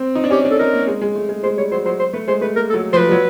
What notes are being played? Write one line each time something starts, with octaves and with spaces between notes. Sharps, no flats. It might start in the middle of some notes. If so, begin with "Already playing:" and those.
Already playing: C4
D#4
D4
C#4 G4
D4
A4
D#4 A#4
A#3
G#3
G#3
A3
G#3
G#3 C5
G3 C#5
F#3 C5
F#3 C5
C5
A3 B4
G#3 C5
A3 B4
A#3 A#4
A4
F#3
F3 B4 C5
G3
F#3